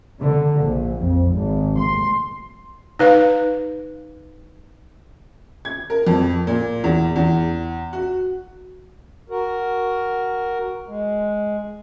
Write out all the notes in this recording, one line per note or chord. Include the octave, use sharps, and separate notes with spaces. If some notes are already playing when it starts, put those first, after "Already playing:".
D3
A#1
F2
G#1
C6
D#4 B4 F5
G#6
A#4
F2
A#2
E2
E2
F#4
F#4 A#4
G#3